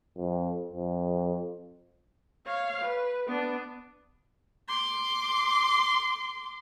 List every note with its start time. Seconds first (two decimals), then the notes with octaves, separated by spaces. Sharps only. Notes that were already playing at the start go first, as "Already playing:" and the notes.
0.17 F2
0.73 F2
2.46 C#5 F5
2.82 B4
3.28 B3 D4
4.68 C6 D6